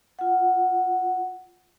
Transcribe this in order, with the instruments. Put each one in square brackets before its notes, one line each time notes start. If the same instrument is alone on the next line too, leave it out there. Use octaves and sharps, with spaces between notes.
[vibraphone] F4 F#5